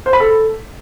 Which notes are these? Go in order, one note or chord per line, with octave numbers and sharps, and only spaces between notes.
C5
B5
A4